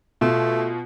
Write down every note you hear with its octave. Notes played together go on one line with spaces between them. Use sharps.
B2 A3 F4